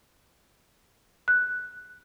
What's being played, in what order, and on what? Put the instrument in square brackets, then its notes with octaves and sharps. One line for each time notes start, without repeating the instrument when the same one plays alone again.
[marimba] F#6